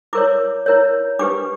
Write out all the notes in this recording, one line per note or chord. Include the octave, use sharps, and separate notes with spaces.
E4 A#4 C#5 D6
E4 A#4 C#5
D4 G4 B4 D6